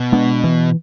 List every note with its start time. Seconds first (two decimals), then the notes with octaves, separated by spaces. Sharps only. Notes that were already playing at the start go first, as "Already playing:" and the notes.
Already playing: B2
0.12 G#3 B3 D4
0.44 E3